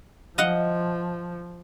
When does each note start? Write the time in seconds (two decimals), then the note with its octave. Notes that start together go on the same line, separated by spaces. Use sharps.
0.38 F3 D#5 F5 F#5